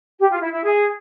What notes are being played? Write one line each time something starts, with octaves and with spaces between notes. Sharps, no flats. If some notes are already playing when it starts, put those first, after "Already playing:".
G4
F4
E4
E4
G#4